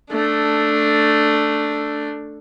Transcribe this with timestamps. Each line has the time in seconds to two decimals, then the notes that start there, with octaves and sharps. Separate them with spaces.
0.11 A3 D4